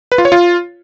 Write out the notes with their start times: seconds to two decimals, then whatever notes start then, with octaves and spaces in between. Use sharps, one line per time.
0.12 B4
0.18 F4
0.25 C#5
0.32 F4